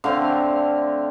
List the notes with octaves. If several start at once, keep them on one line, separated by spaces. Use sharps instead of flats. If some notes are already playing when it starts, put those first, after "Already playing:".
D3 A3 C4 F5